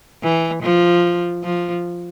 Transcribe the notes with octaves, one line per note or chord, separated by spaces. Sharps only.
E3
F3
F3